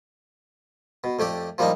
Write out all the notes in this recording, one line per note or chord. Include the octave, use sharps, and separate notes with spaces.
B2
F2 A3 G4 D5
F3 G3 A#3 D4 D#4